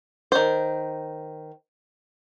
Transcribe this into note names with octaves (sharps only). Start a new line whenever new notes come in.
D#3 C5